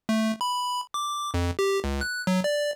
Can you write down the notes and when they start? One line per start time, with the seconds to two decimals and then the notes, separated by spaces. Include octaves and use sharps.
0.09 A3
0.41 B5
0.94 D6
1.34 F2
1.59 G4
1.84 C#2
2.01 F#6
2.27 F#3
2.44 D5